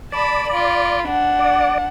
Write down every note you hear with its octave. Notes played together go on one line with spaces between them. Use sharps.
D5 A5 B5
F4 B5
D4 F#5
D5